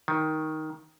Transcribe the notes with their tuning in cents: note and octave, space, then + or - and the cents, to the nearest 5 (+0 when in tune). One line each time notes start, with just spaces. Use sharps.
D#3 +10